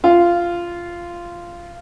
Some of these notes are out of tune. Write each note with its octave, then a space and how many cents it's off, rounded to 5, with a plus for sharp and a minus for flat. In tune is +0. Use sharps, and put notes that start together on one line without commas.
F4 -10